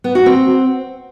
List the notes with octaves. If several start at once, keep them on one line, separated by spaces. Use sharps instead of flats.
B3
F#4
C4